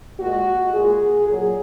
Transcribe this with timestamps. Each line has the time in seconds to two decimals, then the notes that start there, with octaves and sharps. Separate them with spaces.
0.20 A#2 G#3 F#4
0.74 A#2 G#3 G#4
1.28 A#2 F#3 G#4